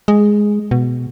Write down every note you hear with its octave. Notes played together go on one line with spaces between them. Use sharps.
G#3
B2